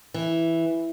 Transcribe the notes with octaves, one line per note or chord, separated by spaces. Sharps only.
E3